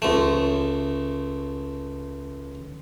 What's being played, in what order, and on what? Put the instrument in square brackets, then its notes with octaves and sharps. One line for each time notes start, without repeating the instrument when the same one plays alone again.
[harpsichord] C#2 A3